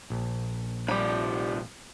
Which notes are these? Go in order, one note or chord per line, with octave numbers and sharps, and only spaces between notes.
A#1
C2 F3 G3 B5